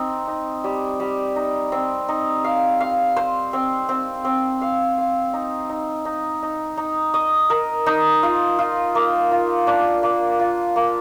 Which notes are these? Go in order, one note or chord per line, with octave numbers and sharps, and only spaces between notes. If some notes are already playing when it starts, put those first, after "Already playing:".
Already playing: C4 D#4
D#4
G3
G3
D#4
C4
D#4
F5
F5
C5
C4
C4
C4
F5
F5
D#4
D#4
D#4
D#4
D#4
D#5
A#4
D#4
F4
F4
A#3
F4
D4
A#3
F4
A#3